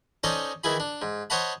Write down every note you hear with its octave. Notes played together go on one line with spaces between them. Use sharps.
C#4 D#4 A4 C5 D5 D#5
D#3 E3 E4 G#4 B5
D4
G#2
C5 C#5 D#5 F#5 A5 B5